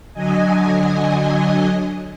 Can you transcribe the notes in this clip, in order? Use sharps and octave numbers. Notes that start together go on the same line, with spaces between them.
D3 F#3 D#5 G#5